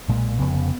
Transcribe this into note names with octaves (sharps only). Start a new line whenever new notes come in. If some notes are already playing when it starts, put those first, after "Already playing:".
B1 A#2 G#3
F1 F2 C#3 B3
B3